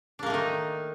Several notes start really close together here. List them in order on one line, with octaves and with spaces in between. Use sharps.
D4 A#3 A3 D#3 D#4